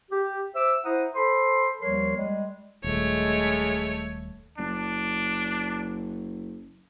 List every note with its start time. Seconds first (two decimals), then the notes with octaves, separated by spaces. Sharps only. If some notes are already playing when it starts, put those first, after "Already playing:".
0.11 G4
0.55 C5 E5 D6 E6
0.85 E4 C5 F#5 A#5 D#6
1.15 A4 C5 B5 C6
1.81 D#2 F3 G3 A#4 C#5 C6
2.16 G3 G#3
2.84 D#1 G#3 A3 C#5
4.58 F#1 D4